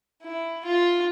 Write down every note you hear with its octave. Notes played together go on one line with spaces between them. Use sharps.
E4
F4